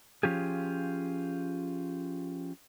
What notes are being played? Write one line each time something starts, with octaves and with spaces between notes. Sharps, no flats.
F3 C#4 F4 G4 G#4